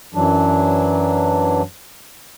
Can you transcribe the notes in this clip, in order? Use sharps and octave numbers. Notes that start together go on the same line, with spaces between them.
F#2 E3 F#3 D4